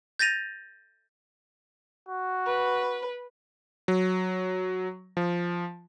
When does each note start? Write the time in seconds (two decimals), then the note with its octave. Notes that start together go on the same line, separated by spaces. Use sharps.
0.19 G6 A6 A#6 D#7 F7
2.09 F#4
2.47 B4
3.88 F#3
5.17 F3